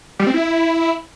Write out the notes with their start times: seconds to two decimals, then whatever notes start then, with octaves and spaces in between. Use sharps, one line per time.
0.19 G3
0.27 C4
0.34 E4